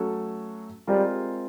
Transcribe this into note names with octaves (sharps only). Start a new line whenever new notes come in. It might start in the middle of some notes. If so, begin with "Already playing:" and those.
Already playing: F#3 A3 C#4 F#4 A4
G3 G#3 C4 F4 A#4